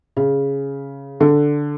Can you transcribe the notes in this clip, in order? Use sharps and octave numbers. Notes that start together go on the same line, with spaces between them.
C#3
D3